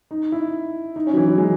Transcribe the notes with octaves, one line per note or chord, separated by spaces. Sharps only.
D#4
E4
D#4
C#4
F#3
E3
F#3
G#3